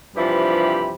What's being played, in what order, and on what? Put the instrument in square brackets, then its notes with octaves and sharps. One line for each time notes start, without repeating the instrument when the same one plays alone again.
[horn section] G2 C3 E3 F3 G4 B5